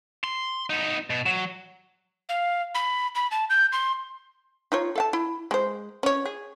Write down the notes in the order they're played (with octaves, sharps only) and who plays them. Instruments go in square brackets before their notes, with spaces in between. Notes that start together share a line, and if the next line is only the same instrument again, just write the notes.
[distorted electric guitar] C6
B3 D#4
B2
F#3
[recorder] F5
B5
B5
A5
G6
C6
[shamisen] D#4 F4 C#5
A4 F5 A5
E4
G#3 C5
C#4 C#5
G#4